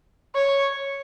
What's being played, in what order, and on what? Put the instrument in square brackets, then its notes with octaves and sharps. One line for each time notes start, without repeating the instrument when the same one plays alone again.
[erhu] C#5